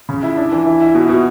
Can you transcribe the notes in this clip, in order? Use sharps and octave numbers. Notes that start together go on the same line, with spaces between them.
C#3
E4
D4
E3
E4
E4
B2
B2